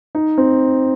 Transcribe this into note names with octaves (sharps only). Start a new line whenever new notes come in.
D#4
C4